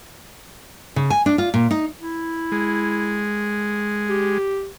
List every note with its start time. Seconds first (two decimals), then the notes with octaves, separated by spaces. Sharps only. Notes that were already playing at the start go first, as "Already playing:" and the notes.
0.96 C#3
1.10 G#5
1.26 D4
1.38 F4
1.54 A#2
1.71 D#4
1.99 E4
2.52 G#3
4.09 G4